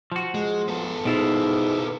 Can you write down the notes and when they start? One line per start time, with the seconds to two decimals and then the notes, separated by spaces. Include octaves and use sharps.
0.12 F3 F#4
0.35 G#3
0.68 B3 A4
1.05 G#2 B2 E4 F4